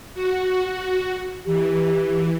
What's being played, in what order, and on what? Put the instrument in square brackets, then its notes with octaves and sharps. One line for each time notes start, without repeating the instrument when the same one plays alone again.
[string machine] F#4
[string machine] E3 [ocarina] G4